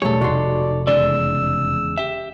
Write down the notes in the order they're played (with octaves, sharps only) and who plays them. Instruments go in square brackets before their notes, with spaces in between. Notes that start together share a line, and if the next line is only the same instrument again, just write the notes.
[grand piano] E1 G3 [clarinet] F#3 [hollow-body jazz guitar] A3 G#4 [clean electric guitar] A4 C#5
[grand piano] F1 D#4 [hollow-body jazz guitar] F#4 C6 [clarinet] D5
[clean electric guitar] E2 C#3 G#3 [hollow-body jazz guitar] D5 [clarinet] E6
[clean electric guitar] G4 E5